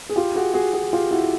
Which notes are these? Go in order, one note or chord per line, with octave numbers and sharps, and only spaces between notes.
G#4
F4 G4
F#4 G#4
F#4 G#4
F#4 G#4
F4 G4
E4 F#4